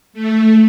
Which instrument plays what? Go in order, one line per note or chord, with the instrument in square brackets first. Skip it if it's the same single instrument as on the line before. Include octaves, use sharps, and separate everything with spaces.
[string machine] A3